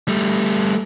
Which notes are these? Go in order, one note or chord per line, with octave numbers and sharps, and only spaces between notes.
G3 A3